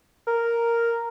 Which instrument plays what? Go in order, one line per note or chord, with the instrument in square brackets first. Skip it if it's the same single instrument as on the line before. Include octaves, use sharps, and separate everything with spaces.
[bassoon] A#4